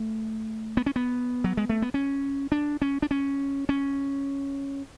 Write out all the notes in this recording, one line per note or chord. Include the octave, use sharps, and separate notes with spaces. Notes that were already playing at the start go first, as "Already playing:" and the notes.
Already playing: A3
B3
C#4
B3
F#3
G#3
A3
B3
C#4
D4
C#4
D4
C#4
C#4